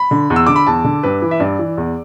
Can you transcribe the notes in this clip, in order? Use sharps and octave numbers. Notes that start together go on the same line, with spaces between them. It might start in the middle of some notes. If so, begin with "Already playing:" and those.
Already playing: B5
D3
E2
E6
D3 D6
B5
E2 A5
D3
G2 B4
E3
E5
G2 D5
E3
E2